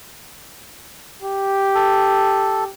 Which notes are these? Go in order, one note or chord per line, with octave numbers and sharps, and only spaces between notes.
G4
A4